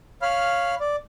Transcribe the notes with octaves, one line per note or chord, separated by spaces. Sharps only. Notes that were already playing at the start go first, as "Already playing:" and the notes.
C#5 F5 B5 F6
D5